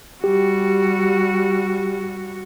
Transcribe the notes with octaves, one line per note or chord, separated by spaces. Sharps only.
G3 F#4 G4